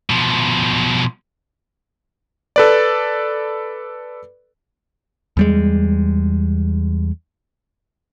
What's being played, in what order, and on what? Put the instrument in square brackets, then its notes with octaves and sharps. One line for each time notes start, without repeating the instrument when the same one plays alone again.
[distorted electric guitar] B2 F3
[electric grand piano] A4 B4 D5
[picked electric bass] E2 G3 G#3